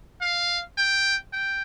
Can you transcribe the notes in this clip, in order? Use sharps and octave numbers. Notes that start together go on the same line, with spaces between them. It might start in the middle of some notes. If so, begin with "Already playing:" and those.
F5
G5
G5